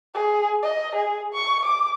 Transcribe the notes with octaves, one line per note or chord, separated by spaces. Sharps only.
G#4
D#5
G#4
C#6
D6